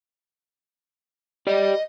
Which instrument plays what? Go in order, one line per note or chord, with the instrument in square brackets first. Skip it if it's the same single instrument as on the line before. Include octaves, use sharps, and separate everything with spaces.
[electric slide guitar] G4 D5 [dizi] D#5